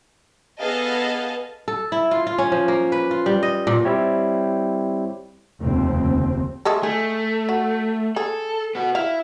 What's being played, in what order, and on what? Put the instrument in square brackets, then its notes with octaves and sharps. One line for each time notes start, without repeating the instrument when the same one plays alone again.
[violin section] B3 G#4 A4 D#5 F5 A5
[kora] A4
E4
F4
F4
C#4
F3
A#3
B4
F4
G3
D#5
A#2
[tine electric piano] G3 C4 E4 G4 C#5
[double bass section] F1 D#2 C#3 C4
[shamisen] G#3 A3 A4
[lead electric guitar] A3 [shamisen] G#4
[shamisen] F#4
[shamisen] G#4 [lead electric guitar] A4
[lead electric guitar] B3 F#4
[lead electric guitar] E4 [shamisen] F5